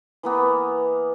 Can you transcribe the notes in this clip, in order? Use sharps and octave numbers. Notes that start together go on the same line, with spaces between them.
E3 A#3 B3